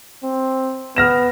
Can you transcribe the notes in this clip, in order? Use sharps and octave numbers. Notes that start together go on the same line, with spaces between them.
C4
B3 F6 A#6 E7